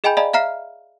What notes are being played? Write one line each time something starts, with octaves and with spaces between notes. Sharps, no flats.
G#4 D#5 G5 G#5 B5 G6
D5 D#5 F5 G#5 A#5 B5
E5 F5 A#5 F6 C7